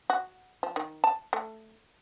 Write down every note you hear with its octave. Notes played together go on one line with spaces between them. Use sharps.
F#4
F3
D#3
A5
A3